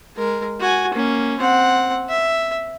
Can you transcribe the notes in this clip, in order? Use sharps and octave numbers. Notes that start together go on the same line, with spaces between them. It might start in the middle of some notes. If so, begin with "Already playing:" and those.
G#3 A#4
F#4 G#5
A#3 C#4
C4 F#5
E5